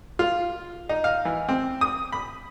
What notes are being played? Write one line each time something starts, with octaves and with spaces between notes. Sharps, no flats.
F4
D#4
F5
E3
C4
D#6
B5